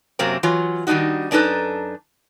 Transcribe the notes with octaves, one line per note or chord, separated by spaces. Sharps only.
F#2 C3 F#3 A#3 C4
E3 F#3 F4 C#5
D#3 G3 A3 D4 D#4 F#4
F#2 D4 D#4 A4 B4 A#5